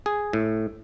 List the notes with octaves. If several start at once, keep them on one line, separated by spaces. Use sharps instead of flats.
G#4
A2